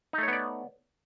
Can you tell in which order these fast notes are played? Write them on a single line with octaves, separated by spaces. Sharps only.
D#4 A3 C#5 B3 D5